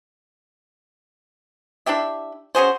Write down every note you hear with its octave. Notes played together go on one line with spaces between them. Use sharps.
D4 E4 G4 E5
C#4 F#4 G#4 C5